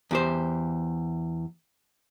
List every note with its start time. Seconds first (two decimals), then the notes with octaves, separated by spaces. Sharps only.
0.11 E2 G4 C5